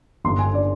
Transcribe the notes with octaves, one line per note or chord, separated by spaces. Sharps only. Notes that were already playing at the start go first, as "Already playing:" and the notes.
G1 C6
D3 G#5
D5